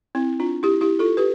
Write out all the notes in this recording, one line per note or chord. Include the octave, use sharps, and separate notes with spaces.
C4 E4
D4 F4
E4 G4
E4 G4
F4 A4
G4 B4